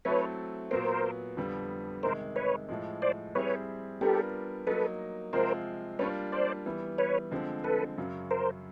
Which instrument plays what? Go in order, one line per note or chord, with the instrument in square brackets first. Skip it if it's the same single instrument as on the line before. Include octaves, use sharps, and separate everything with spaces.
[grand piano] F#3 A3 C4 E4 A4 [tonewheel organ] B4 C#5
[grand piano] A#2 F#3 B3 [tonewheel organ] A#4 C5
[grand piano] F2 D3 G3 B3
[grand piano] C3 D#3 G#3 [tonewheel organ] A#4 C5
[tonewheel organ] B4 C#5
[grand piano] A2 F3 G#3
[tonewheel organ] C5 D5
[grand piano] G3 C4 E4 G#4 [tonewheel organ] B4 C#5
[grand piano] G3 B3 D4 F4 A#4 [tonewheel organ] G4 A4
[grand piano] F#3 A#3 D#4 [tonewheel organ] A4 B4
[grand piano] C3 F3 G#3 C4 F4 [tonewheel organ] A#4 C5
[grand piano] G3 A#3 D4 F4 [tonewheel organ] B4 C#5
[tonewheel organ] C5 D5
[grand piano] E3 G3 B3
[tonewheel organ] B4 C#5
[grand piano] D3 F3 G#3 C4
[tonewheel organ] A4 B4
[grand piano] F#2 C#3 F#3
[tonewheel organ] A#4 C5